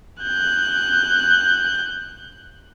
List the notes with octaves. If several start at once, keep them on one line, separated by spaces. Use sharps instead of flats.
F#6 G6